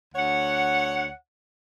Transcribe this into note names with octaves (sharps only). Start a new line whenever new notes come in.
D2 C#5 F#5